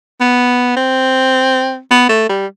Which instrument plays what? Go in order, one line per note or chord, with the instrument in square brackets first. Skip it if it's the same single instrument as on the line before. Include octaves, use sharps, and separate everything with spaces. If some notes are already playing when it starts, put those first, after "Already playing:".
[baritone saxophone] B3
C4
B3
A3
G3